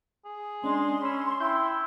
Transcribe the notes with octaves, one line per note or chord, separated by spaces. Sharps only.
G#4
G#3 C#4 D4 C6
C#4 B5 E6
E4 E5 G5 G6